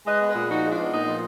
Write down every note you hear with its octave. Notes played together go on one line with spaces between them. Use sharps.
G#3 B4 D#5
B3
G#4 B4
A#2
F3 D#4 F#4
G#3
D4 F4
B3
A#2 D#4
F3